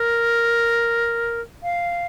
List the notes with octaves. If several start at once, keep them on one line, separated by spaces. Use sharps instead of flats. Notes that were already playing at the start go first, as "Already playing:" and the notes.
Already playing: A#4
F5